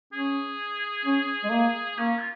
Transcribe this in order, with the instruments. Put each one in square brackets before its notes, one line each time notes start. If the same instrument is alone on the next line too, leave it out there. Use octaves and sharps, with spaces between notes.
[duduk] C#4 [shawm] G#4
[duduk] C#4
G#3
A#3
[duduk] A#3 [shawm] C#4
[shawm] F4